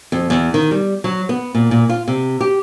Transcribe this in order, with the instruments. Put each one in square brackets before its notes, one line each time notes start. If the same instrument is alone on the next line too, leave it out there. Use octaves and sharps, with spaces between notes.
[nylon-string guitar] F2
E2
D#3
G3
F#3
B3
A#2
A#2
F4
C3
G4